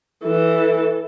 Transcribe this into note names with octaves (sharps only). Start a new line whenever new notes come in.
E3 A4